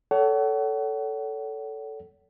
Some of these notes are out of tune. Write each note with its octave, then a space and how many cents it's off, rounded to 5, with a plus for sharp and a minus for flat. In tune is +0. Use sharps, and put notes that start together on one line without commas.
A4 +0 C#5 +35 F#5 +35